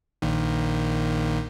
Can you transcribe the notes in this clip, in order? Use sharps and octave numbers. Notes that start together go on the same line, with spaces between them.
A#1 A#2 D#3